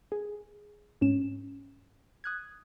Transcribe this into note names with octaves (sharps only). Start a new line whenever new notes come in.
G#4
G#2 C#4 E7
D#6 F#6 G#6